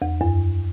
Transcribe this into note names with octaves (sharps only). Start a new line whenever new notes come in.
E2
F#2